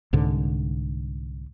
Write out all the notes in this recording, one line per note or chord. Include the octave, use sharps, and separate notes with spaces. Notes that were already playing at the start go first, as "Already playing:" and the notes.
C2 G#2 D3